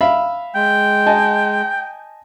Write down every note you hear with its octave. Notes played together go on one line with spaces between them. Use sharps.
E5 F5 B5
G#3 G5
D#5 G#5 A5